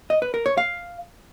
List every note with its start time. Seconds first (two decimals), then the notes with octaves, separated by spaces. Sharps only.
0.10 D#5
0.22 B4
0.34 A#4
0.46 C#5
0.57 F5